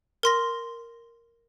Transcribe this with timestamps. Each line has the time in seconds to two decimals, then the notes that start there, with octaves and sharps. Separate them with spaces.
0.23 A#4 C6 A#6